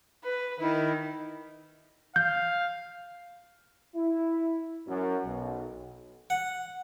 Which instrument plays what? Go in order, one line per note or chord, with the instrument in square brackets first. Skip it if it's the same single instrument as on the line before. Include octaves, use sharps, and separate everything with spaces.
[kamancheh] B4
[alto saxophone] D#3 [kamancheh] E4
[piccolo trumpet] F5 [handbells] G6
[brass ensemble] E4
F#2
B1
[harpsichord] F#5